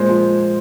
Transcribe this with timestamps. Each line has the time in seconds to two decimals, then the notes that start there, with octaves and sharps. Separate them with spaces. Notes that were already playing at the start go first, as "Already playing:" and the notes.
Already playing: A#2 G#3 C5
0.09 F3